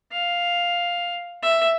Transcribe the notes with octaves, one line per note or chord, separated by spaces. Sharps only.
F5
E5